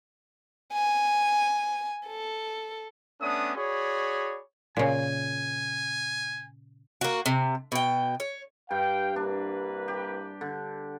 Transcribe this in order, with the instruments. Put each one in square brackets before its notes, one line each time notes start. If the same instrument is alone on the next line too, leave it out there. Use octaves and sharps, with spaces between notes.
[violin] G#5
A4
[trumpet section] A3 B3 C#4 D4 D#6
F#4 G#4 C#5 D5 B5
[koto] A#2 C#3 [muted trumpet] G#5
[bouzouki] A#3 F#4
C3
B2 G5
C#5
[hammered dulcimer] G2 [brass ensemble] B4 F5 G5
[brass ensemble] C2 A#3 B4 [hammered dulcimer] D4
[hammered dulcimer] G4
D3